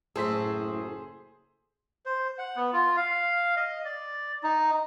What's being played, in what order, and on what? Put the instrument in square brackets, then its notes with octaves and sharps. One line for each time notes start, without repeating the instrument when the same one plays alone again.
[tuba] F#1 [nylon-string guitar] A2 F#3 [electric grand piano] G#4 C5 B6 [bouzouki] A4
[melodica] C5
F#5
B3
F4
F5
D#5
D5
D#4